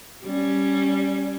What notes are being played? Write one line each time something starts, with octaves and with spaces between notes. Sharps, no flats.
G3 C#4